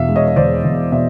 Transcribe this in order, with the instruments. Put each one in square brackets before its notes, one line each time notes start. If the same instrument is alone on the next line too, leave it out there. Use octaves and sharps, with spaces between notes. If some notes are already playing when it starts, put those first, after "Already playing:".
Already playing: [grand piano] E2 B2 E5 F5
G#3
C#5 D#5
C#5
E2 C5 D5
E2
B2 D5 E5